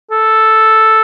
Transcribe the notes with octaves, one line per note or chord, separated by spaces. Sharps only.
A4